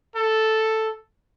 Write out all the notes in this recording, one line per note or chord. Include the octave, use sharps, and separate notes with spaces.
A4